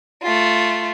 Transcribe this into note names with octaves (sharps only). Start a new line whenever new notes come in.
A3 F4